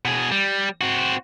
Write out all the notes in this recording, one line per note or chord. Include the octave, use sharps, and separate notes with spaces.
B2 G#4
G3
C4 F#4